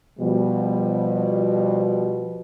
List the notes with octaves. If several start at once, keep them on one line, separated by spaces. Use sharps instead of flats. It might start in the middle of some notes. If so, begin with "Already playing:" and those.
B2 F3 G3